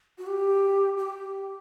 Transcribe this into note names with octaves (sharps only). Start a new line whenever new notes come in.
F#4
G4
G4